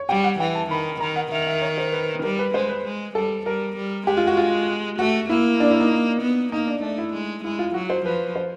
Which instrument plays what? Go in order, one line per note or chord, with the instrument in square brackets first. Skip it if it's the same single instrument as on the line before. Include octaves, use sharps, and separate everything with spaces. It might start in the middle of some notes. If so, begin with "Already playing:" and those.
Already playing: [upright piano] C#5
[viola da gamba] G3 [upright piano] G5
[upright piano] F#5
[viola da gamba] E3 [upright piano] G5
[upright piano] A5
[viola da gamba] D#3 [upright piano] B5
[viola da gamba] D#3 [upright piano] A#5
[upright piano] F#5
[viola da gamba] D#3 [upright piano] E5
[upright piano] E5
C#5
C5
B4
[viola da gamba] G3 [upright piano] A#4
[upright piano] B4
[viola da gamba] G#3 [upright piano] C5
[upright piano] B4
[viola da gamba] G#3
[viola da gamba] G3 [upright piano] A4
[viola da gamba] G3 [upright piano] A#4
[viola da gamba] G3
[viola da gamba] G#3 [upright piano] G4
[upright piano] F4
F#4
F4
[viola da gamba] A3 [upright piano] F#4
[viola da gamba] A#3 [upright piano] E4
[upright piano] D4
E4
D#4
[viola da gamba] B3
[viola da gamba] A#3 [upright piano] D#4
[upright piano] D4
[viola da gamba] A3 [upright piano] D4
[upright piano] E4
[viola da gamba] G#3
[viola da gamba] G#3 [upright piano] E4
[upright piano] F4
[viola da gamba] F#3 [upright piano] F#4
[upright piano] C5
[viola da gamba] F3 [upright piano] B4
[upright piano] C5